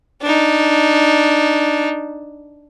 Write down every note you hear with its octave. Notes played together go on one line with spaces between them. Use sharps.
D4 D#4